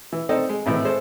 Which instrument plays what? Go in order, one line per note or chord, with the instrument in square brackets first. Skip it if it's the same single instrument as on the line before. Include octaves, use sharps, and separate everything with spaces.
[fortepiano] E3
C4 D#4 A4 D5 D#5
G#3
G#1 A2 E3
G#3 A4 C5